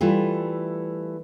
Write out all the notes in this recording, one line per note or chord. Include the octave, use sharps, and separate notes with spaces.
E3 G3 A3 F4